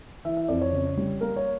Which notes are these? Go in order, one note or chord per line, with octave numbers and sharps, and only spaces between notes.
E3 E5
E5
F2 D5
C#5
C#3
G3
A#3 A#4
C#5